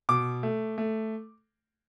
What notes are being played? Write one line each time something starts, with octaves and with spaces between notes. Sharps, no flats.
B2 D6
A3
A3